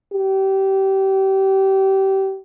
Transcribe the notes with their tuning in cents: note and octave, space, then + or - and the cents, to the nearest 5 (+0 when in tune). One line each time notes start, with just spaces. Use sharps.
G4 -25